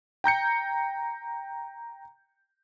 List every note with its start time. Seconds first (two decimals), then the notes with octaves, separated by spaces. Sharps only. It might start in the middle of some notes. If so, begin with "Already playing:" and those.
0.24 G5 A#5 G6 C#7